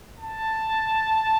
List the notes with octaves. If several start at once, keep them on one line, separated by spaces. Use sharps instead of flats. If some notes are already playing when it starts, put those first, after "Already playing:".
A5